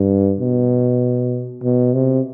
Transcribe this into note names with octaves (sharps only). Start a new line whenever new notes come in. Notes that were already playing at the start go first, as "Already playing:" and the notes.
Already playing: G2
B2
B2
C3